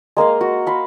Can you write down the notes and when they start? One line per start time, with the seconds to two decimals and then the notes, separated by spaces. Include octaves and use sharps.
0.17 G#3 A#3 D#5 F5
0.41 F#4
0.67 F5 B5 C6